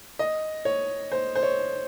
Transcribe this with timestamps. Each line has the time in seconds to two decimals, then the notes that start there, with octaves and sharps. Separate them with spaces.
0.19 D#5
0.65 C#5
1.12 C5
1.35 C5
1.43 C#5